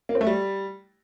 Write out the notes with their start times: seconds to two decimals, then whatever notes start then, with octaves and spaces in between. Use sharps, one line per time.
0.09 A#3
0.15 C4
0.21 A3
0.27 G3